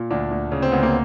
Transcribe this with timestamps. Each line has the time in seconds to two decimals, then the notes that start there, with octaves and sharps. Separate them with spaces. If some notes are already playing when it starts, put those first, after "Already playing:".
Already playing: A#2
0.10 D2 D4
0.31 D2
0.51 C#3 C#4
0.62 C4
0.72 D2 B3
0.83 A#3